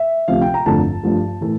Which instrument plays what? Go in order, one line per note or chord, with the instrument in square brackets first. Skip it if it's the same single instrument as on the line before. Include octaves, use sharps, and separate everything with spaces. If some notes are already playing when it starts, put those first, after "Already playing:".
Already playing: [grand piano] E5
D2 C3 F3 F5
G5
A#5
G1 F2 D3 F3 A3 A5
G2 F3 A3
A2 E3 A3